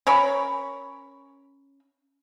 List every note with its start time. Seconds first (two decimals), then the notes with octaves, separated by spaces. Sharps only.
0.07 C#4 A#4 C#5 B5